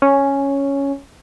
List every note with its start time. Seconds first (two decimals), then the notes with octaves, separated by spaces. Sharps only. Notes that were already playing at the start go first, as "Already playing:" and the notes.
0.02 C#4